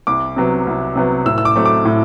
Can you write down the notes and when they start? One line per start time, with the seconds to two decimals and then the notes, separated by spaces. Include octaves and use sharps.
0.07 C2 D6
0.37 C3 F#3 B3
0.67 C2
0.96 C3 F#3 B3
1.25 A2 E6
1.38 E6
1.45 D6
1.56 F#3 A3 C4
1.65 D6
1.85 A2